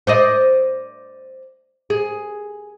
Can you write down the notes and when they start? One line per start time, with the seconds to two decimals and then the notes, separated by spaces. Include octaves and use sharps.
0.07 C5 D5 D#5
1.90 G#4